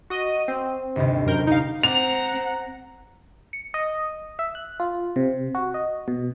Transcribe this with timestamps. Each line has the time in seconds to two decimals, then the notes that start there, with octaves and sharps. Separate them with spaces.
0.10 F#4 D#5 D#7
0.48 C4
0.96 G1 D#2 C3
1.27 F#2 A#4 G6
1.47 D#4 F5
1.83 C4 F#5 A#5 F7
3.53 C#7
3.74 D#5
4.39 E5
4.55 F#6
4.80 F4
5.16 C3
5.55 F#4
5.74 D#5
6.08 B2